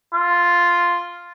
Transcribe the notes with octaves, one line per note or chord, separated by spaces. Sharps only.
F4